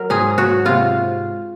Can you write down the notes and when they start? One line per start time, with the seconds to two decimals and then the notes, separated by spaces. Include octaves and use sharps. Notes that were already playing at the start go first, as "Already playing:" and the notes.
Already playing: F#3 A#4
0.10 G#2 G#4
0.38 F#3 F#4
0.65 C3 F4